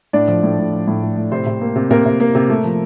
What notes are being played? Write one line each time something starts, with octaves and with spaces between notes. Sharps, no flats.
A2 D4 D5
F3
A2
A2
F3
A2
A3
A2
C3 C4 C5
C3
A#3
C3
C3 A#3 A#4
C3
A#3
C3
A3
F3